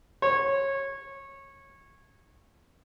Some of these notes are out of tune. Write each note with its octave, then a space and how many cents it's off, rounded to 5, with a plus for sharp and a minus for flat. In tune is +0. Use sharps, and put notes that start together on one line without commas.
C#5 -20